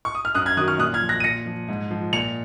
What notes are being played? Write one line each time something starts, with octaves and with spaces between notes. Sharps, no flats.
C#6
D#6
F6
F#2 D#6 F#6
F6 G#6
D#3 F#3 D#6 F#6
C#6 F6
A#2 D#6 F#6
F6 G#6
F3
F#6 A#6
D#7
A#2 A#6 C#7
F3
G#2
F3
A#2 C#7 F7